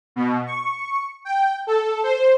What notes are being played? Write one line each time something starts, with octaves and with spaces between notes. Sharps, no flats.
B2
C#6
G5
A4
C5